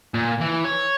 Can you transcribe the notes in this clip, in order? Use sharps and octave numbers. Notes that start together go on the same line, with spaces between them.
A#2
E3
C#5